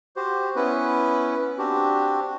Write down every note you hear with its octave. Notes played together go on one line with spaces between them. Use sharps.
F#4 G4 C5
B3 C#4 E4 B4
C4 D4 F#4 G4